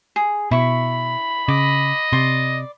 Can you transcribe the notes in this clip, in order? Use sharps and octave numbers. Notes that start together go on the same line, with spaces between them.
G#4
B2 E4 B5 C#6
C#3 D#5 D6
C3 D5 C6